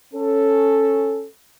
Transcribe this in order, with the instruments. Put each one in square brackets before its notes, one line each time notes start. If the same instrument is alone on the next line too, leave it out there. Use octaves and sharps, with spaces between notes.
[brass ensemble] C#4 A4